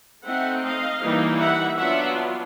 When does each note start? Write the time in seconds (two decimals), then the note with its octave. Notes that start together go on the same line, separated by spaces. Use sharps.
0.25 A3 C4 D#4 E5 F#5
0.63 D#5 F5
1.02 E3 G3 A#3 D#4
1.39 E5 F#5
1.78 F#3 B3 D4 F4 E5 F#5